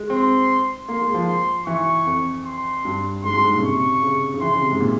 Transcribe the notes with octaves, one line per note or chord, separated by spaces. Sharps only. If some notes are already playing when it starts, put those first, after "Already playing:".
Already playing: G#3
C4 C6
A#3 C6
G#3
F3
C6
E3 C#6
F2
C6
G2
G#2 C6
G2
G#2
A#2
C#3
C3 C#6
C#3
C#3
E3 C6
C#3
C3
G#2
A#2